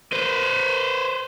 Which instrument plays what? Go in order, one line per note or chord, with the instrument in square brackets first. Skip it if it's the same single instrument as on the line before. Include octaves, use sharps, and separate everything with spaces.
[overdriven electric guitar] B4 C5